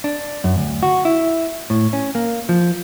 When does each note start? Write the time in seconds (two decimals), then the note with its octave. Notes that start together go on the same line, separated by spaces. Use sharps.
0.04 D4
0.44 F#2
0.58 D2
0.83 F#4
1.05 E4
1.70 A2
1.93 C#4
2.15 A#3
2.49 F3